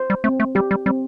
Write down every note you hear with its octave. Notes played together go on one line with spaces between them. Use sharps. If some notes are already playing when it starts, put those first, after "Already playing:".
Already playing: C5
G3
A3 C4
A3
G3 G4
G3
G3 C4